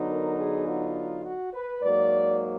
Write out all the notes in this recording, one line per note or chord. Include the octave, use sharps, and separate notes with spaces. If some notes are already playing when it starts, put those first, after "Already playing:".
Already playing: D3 F#3 B3 D#4
A#4
G#4
F4
F#4
B4
G#2 F#3 A#3 D5